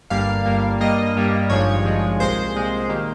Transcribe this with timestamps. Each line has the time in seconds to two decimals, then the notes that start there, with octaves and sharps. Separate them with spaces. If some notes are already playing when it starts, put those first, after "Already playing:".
0.10 G1 G2 G3 A#3 F5
0.46 G1 G2 G3 A#3
0.81 G2 G3 A#3 D#5
1.16 G2 G3 A#3
1.50 G#1 G2 F3 G#3 C#5
1.85 G#1 G2 F3 G#3
2.20 C2 A#2 G#3 C5
2.55 C2 A#2 G#3
2.89 D#3 A#3 G4